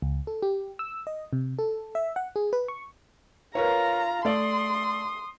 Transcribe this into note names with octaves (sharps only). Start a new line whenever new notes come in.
C#2
A4
G4
E6
D#5
C3
A4
E5
F#5
G#4
B4
C#6
F4 A#4 B4 C#5 A#5
A3 D5 C6 D#6